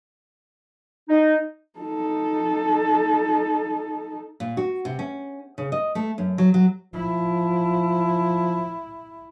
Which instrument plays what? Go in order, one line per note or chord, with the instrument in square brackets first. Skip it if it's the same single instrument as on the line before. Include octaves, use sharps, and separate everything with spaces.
[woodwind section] D#4
[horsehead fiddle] D#4 A4
[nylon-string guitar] A#2
F#4
C3
C#4
C#3
D#5
A3
F#2
F#3
F#3
[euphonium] F3 [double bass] E4